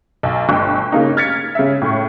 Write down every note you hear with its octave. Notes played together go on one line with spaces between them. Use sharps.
B1
G1 G5
C#3 A#3 D#4
F6 G#6 A6 B6 C#7
C#3 E5
A2 C#6